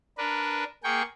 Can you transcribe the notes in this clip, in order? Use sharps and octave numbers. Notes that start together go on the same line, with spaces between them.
D4 A#4 B4
A#3 G#4 G5 C#6